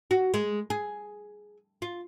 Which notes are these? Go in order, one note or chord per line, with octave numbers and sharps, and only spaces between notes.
F#4
G#3
G#4
F4